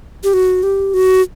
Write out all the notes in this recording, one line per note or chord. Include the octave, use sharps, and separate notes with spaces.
G4
F#4
G4
F#4